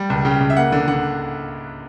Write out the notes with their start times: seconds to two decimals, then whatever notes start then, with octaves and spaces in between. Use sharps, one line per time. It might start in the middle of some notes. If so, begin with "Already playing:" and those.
Already playing: G3
0.10 C#2
0.25 C#3 G5
0.40 C#2
0.50 E5
0.57 A#3 F#5
0.72 D3
0.88 D3 F#5